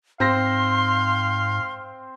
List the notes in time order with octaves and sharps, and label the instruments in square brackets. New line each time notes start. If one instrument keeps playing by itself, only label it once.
[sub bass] G#2 [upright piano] C4 C5 A#6 [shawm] F5 [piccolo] C6